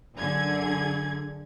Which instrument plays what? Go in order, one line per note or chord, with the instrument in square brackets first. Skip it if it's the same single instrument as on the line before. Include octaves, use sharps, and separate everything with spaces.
[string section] F#2 D3 G#4 G#6